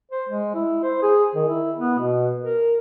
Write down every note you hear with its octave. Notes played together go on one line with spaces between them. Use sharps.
C5
G#3
E4
C5
G#4
D#3
E4
B3
B2
A#4